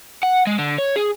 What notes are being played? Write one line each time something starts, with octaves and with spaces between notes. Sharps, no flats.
F#5
G#3
D3
C#5
G#4